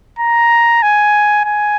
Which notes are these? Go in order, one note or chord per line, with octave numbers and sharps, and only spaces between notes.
A#5
G#5
G#5